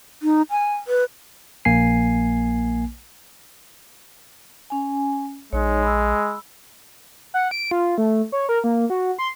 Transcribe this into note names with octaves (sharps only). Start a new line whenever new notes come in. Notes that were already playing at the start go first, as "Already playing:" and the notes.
D#4
G#5
B4
A#1 A#3 G#5 C7
C#4 G#5
A#1 G#3 D#4 C#5
B5 E6
F#5
D7
F4
A3
C#5
A#4
A#3
F#4
C6